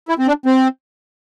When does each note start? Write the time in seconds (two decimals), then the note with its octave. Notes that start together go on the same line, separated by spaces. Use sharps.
0.09 E4
0.19 C4
0.27 D4
0.46 C4